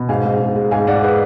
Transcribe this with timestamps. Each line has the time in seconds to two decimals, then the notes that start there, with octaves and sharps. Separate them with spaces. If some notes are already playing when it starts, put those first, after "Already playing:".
Already playing: B2
0.09 G#2 F5 G#5
0.25 G#2
0.40 G#2
0.56 G#3
0.71 G#2 F5 G#5
0.87 G#2 D5 F#5
1.03 G#4 B4